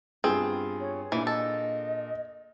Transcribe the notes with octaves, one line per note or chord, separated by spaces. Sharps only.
G2 B3 C4 F4 G#4
C#5
A#2 E3 D4 B5
A4 D#5